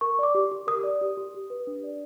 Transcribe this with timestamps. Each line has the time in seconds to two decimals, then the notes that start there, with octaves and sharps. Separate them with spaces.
0.01 A#4 C#6
0.19 D5 D6
0.35 G4
0.51 G4
0.67 A#4 D#6
0.84 D5
1.01 G4
1.17 G4
1.34 G4
1.50 B4
1.67 D4
1.83 D5